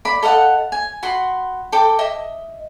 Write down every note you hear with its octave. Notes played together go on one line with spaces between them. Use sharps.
D5 B5
A4 D#5 F5 F#5
G#5
F#4 B5 C6
A4 G5 D6
D#5 E5